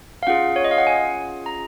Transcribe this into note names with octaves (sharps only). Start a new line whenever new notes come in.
F5
C#4 F4 G#4 F#5
C#5
D#5
F5
F#5
G#5
A#5